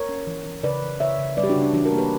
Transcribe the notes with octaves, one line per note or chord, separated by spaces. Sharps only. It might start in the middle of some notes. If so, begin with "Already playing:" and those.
Already playing: A#4 C#5
C#4
E3
E3
C#3 B4 D5
E3
C#3 C#5 E5
C#3
G3 B4 D5
G4
D4 F#4
C#3
D4
E3 D4 F#4
F#4 A#4
A#3
G4 B4